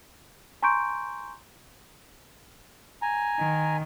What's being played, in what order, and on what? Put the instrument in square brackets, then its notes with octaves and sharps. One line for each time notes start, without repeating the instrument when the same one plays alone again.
[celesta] G#5 A#5 C6 C#6 G6 D7
[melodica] G#5 A#5
[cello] D#3